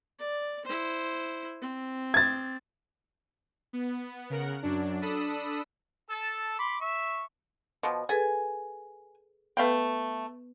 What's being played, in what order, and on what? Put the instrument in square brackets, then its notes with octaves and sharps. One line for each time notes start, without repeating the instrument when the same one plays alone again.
[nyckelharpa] D5
E4 C5
C4
[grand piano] G#6 A6
[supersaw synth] B3
C#3 A#4 F#5
F#2 F#3 D4
D4 A4 B5 D#6 E6
[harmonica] A4 A5 E6
B5 C6 D6
E5 C#6
[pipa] B2 F3
[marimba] G#4 A4 B4 [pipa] G#5
[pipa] A3 F5 G5 [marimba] B3 B4